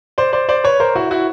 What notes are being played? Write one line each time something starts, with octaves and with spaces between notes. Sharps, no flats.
C5 D5
C5 D5
C5 D5
B4 C#5
A#4 C5
E4 F#4
E4 F#4